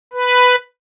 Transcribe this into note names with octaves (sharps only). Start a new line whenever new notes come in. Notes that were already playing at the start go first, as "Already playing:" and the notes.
B4